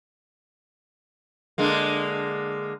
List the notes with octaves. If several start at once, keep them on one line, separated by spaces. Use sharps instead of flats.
D3 G#3 A#3